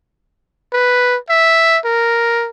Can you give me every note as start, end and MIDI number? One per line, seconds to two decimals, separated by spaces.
0.73 1.17 71
1.30 1.78 76
1.85 2.50 70